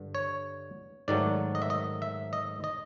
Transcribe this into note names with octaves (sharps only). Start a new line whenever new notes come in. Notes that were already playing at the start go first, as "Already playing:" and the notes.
Already playing: G2 D3
C#5
G#2 D#3 F#3 A3 D5
D#5
E5
D#5
E5
D#5
D#5